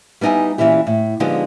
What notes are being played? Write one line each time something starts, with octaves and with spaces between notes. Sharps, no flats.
G3 B3 D#4 E4 G#5
A#2 E3 C#4 E4 G4
A2
D3 F3 G#3 B3 D#4 G4